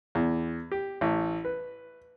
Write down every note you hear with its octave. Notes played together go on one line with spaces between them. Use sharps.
E2
G4
A1
B4